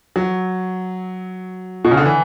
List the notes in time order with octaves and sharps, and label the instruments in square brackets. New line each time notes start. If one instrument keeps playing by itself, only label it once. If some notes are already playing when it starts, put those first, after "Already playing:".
[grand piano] F#3
B2
C#3
D3
E3